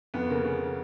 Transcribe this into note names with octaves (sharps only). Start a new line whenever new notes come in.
F2 B3
C#3 A#3
C#3